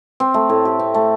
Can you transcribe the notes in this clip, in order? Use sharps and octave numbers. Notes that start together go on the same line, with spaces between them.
C4
A3
A2
G4
C4
A3